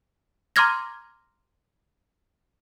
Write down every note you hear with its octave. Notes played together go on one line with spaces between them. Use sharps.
A#5 C6 D6 F6 G#6 A#6